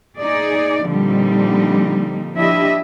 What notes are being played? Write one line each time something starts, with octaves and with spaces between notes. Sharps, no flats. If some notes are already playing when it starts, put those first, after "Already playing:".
D#4 G#4 D5
A#2 D3 F3 G3 C4 D#4
F3 D4 E4 G4 D#5 E5